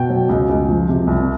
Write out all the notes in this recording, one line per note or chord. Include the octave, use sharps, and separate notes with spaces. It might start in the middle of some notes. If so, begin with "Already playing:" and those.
Already playing: B2 G5
F#3
C#2
C#2
F3
C3
C2